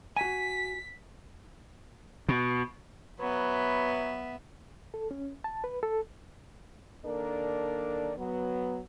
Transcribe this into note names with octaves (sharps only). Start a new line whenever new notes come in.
F#4 G#5 B6
B2
F#3 B3 B4 E5
A4
C#4
A5
B4
A4
D#3 A#3 D4 A4 A#4 D5
F#3 B3